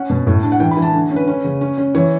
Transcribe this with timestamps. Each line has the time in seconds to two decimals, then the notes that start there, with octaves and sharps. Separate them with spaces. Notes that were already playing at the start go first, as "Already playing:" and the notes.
Already playing: C#4 F#5
0.10 B2
0.27 A2
0.43 D4
0.52 F#5
0.60 E3 G5
0.71 B5
0.77 E3
0.82 A5
0.94 D3
1.11 C#4
1.16 B4
1.27 C#4
1.44 C#3
1.61 C#4
1.78 C#4
1.95 E3 C#5